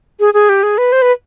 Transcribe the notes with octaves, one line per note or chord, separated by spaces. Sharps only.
G#4
G#4
G4
G#4
B4
C5
B4